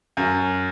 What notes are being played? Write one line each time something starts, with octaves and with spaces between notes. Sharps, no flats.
F#2